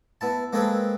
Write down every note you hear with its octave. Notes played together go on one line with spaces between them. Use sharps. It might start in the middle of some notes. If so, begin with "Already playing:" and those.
B3 E4 A5
G#3 A#3 C4 G#4 A4 B4